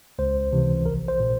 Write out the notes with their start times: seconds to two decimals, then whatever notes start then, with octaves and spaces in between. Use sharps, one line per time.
0.19 C#2 C5
0.53 C3 E3
0.86 A#1 A#4
1.08 C5
1.20 A#2